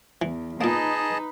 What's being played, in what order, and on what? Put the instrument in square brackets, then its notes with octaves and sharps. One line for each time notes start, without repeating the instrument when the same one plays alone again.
[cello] E2 [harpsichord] E3
[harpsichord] A#2 A#3 [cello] D#4 B4 [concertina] G#4 D#5 A5